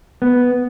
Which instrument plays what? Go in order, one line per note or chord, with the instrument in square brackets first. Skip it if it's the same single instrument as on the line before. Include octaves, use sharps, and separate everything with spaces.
[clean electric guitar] B3